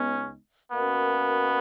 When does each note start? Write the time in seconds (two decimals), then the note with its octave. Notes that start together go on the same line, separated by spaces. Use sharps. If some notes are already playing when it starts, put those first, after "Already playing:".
Already playing: C#2 C#3 G#3 B3 C#4 D#4
0.71 B2 A#3 B3 C#4 F#4 A#4